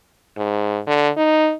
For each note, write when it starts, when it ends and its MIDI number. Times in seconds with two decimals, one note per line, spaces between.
0.38 0.80 44
0.87 1.09 50
1.17 1.54 63